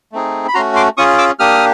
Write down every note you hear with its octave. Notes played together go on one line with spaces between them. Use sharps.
A3 C4 D#4 G#4
B5
A3 C#4 F#4 A#5 C6
C6 D6
C#4 F4 G#4 C#6 D#6
D6 E6
A#3 D4 G4 D#6 F6